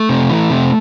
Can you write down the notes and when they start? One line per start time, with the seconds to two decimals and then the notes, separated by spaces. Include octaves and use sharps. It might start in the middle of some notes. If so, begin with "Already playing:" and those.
Already playing: A3
0.09 C3
0.30 E3
0.50 C3